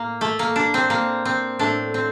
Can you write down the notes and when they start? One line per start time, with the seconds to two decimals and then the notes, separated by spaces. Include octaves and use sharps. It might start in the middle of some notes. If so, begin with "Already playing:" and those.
Already playing: A2 A#3
0.21 A3
0.39 A#3
0.56 D4
0.74 C4
0.90 A#3
1.25 C4
1.59 A2 A3 D4
1.94 C4